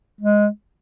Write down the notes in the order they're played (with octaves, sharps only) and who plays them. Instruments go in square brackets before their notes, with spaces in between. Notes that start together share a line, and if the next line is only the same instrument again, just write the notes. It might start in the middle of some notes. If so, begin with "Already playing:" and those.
[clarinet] G#3